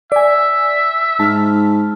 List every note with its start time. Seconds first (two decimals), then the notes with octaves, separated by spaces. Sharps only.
0.12 D5 E5 G#5
1.20 G#2 A5 F6